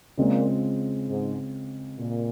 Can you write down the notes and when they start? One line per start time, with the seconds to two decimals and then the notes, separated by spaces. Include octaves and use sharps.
0.18 A#2 C#3 G#3 C4 F4
1.08 G#2
1.98 A#2